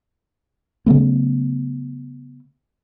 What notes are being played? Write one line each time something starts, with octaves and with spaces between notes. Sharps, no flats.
C#3 F#3 A3 B3